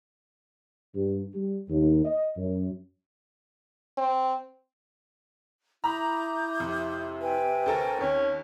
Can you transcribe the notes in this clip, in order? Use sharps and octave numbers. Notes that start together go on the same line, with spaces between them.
G2
G3
D#2
D#5
F#2
C4
E4 A#5 B5 D6 D#6 G6
F2 C3
B4 G5 G#5
D2 A4 A#4 C5
D#2 C4 C#4